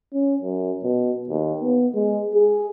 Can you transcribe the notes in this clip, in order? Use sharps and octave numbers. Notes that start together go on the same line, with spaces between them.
C#4
F#2
B2
D#2
B3
G#3
G#4